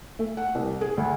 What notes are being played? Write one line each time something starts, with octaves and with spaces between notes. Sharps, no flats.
A3
F#5
C2
G#4
D2